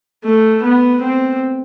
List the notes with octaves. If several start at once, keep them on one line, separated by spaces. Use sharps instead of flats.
A3
B3
C4